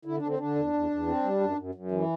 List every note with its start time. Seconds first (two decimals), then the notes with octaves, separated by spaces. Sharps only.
0.05 D3 E4
0.17 D4
0.22 D3
0.27 C4
0.38 D3 D4
0.56 E2
0.73 E2
0.90 E2
1.07 C4
1.23 G3
1.41 F#2
1.57 F#2
1.75 F#2
1.91 E3